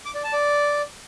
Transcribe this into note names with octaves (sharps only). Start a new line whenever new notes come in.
D6
D5
A5
D5